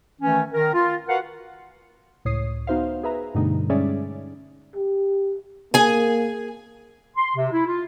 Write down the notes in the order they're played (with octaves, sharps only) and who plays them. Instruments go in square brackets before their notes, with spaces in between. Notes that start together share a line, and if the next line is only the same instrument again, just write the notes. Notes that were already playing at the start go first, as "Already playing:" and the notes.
[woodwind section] D#3 E3 A3 C#4
D#3 A#4
F4
F#4 A#4 B4 F5 F#5
[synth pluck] C#2 A2 C#5 D#6 C7
B3 D#4 F#4 C5 E5 F5
G#4 B4 E5 A#5
G2 B2 D3 G3 A3 D#4
G3 G#3 C#4 G#4 D5 E5
[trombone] G4
[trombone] A#3 [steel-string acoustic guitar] G#4 G#5
[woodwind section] C6
C3
E4
F4